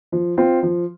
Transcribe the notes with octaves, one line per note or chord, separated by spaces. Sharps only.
F3
C4 F4
F3